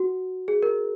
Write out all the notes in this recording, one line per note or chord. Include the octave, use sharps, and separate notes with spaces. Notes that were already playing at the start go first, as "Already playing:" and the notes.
Already playing: F#4
G#4
A#4